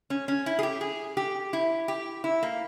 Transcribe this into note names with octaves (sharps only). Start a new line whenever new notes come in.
C#4
C#4
E4
G#4
G4
G#4
G4
E4
G4
E4
A#3